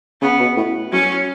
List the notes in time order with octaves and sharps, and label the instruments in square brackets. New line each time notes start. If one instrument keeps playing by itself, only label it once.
[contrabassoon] C#3 [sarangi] B3
[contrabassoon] B2
A2
[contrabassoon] F#3 [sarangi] C#4